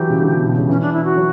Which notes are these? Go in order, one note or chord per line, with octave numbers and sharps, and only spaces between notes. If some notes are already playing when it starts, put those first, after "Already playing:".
Already playing: E3 F#3 G4
C#3
D3
B2
B2
C#3
E3 C#4
D4
E4
F#4
F#3